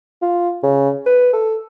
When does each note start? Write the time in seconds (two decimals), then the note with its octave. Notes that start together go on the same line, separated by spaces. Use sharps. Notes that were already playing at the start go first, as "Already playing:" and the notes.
0.22 F4
0.63 C#3
1.06 B4
1.33 A4